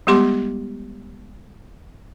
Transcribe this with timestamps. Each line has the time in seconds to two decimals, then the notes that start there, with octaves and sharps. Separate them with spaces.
0.07 G3 G#3 B3 G4 C6 D6